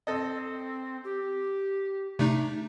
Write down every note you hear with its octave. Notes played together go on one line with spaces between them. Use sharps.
C4 A4 D#5
G4
C3 A3 D4 D#4